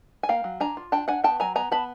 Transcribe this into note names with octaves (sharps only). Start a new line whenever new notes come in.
G#5
A#3 F5 G5
F#3
D4 G#5 A#5
F4
D4 G5 A5
D4 F#5 G#5
B3 G5 A5
F#3 G#5 A#5
B3 G#5 A#5
B3 A5 B5